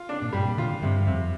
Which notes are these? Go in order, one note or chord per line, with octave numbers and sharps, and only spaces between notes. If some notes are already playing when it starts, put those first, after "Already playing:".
Already playing: F4
D4
A#2
G2 G3
A#2
D3 F4
D3
G2 C3
F2 C3